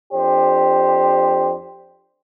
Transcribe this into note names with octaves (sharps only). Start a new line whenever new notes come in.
F2 D4 G4 C5